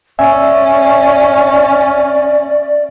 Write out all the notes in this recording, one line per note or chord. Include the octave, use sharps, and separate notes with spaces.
C#4 D5 E5 G#5